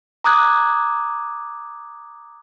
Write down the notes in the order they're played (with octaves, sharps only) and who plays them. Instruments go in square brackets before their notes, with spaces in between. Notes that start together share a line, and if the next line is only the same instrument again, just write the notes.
[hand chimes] A#5 D6 D#6 F#6 G#6